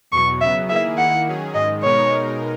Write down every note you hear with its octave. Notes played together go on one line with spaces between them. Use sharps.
E2 B2 F#3 C#6
C#3 F#3 B3 E5
D#3 A#3 E4 G#4 E5
D#3 A#3 E4 F#5
D#3 F#3 C#4 G#4
G#2 D#3 G#3 D#5
B2 G#3 B3 D#4 A#4 C#5
B2 G#3 D#4 A#4